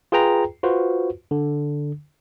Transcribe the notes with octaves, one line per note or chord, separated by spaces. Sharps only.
F4 G#4 B4 G5 A#5
F4 F#4 B4 C5
D3